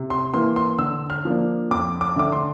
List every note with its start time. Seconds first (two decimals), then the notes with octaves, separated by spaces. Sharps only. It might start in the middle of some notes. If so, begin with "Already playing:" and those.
Already playing: C3
0.10 C6
0.34 E3 A#3 C6
0.56 C6
0.79 D3 E6
1.10 F6
1.25 F3 A#3 D4
1.71 F2 D6
2.01 D6
2.16 D3 A3 D4 D6
2.32 C6